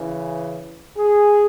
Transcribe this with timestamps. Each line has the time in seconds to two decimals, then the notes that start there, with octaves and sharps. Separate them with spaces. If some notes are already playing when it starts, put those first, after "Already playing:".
Already playing: C#3 E3
0.97 G#4